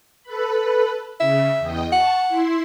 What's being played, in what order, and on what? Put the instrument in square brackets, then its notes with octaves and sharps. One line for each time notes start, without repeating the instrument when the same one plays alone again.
[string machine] A4 B4 B5
[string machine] C#3 [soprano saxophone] E5
[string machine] E2 D#5 G5
[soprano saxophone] F#5 [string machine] A5 C#6
[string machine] E4 C6